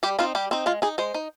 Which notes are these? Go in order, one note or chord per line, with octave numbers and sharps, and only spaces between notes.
G3 G4
C4 D#4 F4
G3 G4
C4 D#4
G#3 F4
D#4 G#4
G#3 C5
D#4